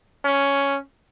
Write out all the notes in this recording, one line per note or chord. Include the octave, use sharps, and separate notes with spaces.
C#4